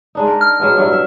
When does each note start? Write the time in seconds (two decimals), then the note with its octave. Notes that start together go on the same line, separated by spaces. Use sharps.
0.15 G#3 D4 D#4
0.27 A#4
0.41 F6
0.60 F#3 G#3 B3
0.77 G2 F#3 E4
0.92 E5